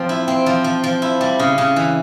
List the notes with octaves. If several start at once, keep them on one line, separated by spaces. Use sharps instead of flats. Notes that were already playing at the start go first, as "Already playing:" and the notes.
Already playing: F3 C4
E4
C4
F3
F3
F3
E4
G3
C#3
C#3
E3